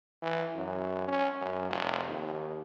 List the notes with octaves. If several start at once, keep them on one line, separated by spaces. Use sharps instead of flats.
E3
F#2
C#4
F#2
F1
D#2